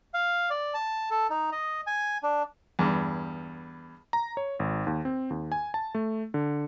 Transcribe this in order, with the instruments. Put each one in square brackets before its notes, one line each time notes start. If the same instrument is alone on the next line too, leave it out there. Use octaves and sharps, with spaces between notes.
[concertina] F5
D5
A5
A4
D#4
D#5
G#5
D4
[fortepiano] E2 G2
[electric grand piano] A#5
C#5
G#1
D#2
C4
D#2
G#5
A5
A3
D3